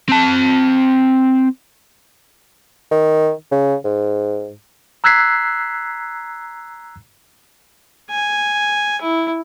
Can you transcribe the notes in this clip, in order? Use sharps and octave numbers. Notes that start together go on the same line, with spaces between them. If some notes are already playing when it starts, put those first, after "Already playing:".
C4 A5
D#3
C#3
G#2
A#5 E6 F#6 G#6 B6 C7
G#5
E4